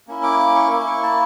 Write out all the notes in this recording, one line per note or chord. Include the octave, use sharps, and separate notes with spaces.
A#3 C#4 E4
D6
D6
C#6
A#3 E4 D6
C#6
A5